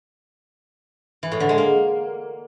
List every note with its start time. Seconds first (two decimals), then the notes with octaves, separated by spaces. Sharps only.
1.23 E3
1.32 A2
1.40 D3
1.49 G#3
1.58 A#3